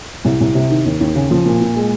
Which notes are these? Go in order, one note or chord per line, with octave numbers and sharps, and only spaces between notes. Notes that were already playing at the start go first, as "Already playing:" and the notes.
C2
C2
C3
D#3
D#2
D#2
C#3
F3
A#2
A#2
G#3